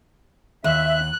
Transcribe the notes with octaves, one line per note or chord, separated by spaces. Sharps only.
D#2 E5 F#6